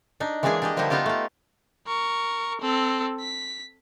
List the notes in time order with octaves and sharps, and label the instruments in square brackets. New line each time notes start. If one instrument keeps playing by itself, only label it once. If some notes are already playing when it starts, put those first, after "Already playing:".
[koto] D4 D#4
E3 G#3 A#3 D4 G#4 G#5
D4 G4 D#5
D3 F3 G3 A#3 D#4 E4
B3 D#4 F4 G4 A4
A3 F4
[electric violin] A#4 C#6
C4 A4
B6